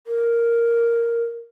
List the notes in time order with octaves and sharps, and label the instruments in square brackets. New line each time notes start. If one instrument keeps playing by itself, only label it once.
[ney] A#4